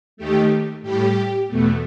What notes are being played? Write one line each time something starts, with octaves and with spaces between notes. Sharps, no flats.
D#2 D#3 A3 G4
A2 G3 G4
E2 B2 A3